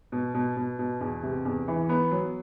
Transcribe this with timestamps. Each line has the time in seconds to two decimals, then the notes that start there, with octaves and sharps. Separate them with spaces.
0.12 B2
0.34 B2
0.57 B2
0.79 B2
1.01 E2
1.23 C3
1.45 E2
1.68 E3
1.89 B3
2.11 F#3